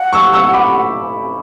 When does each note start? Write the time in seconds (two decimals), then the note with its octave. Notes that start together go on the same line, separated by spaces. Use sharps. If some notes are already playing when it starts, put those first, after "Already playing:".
Already playing: F#5
0.13 C#6 E6
0.33 C#6 E6
0.53 B5 D6